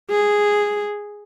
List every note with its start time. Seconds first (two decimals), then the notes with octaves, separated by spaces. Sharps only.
0.11 G#4